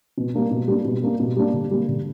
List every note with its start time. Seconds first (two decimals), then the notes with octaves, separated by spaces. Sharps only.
0.17 B2
0.34 G3 A#3 D4
0.51 B2
0.68 G3 A#3 D4
0.85 B2
1.03 G3 A#3 D4
1.20 B2
1.36 G3 A#3 D4
1.53 D3
1.71 G3 A#3
1.88 D3